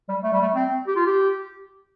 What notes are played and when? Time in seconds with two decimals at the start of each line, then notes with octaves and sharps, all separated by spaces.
0.09 G3
0.23 A3
0.32 G3
0.41 A3
0.55 C4
0.87 G4
0.96 F4
1.06 G4